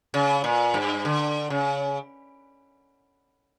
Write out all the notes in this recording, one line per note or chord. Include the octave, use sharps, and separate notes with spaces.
C#3
A#2
G2
D3
C#3